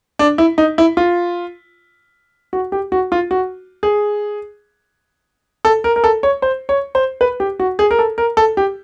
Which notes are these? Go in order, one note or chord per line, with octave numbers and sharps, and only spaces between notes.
D4
E4
D#4
E4
F4
F#4
G4
F#4
F4
F#4
G#4
A4
A#4
A#4
A4
C#5
C5
C#5
C5
B4
G4
F#4
G#4
A#4
A4
A#4
A4
G4